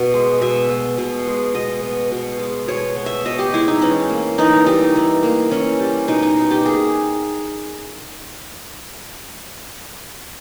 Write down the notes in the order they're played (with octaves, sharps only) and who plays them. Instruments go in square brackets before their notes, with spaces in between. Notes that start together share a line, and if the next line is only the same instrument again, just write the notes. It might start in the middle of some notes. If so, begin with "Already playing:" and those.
Already playing: [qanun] B2 B3
G#3
B2 E5
B3
B2
G#3
B2 D#5
B3
B2
G#3
B2 C#5
B3
E5
B2 D#5
G4
G#3 E4
D#4
E3 C#4
A#3
E3 D#4
G3 D#4
E3
A#3
E3 C#4
G3
B2 D#4
D#4
B2
G4
A#3 G#4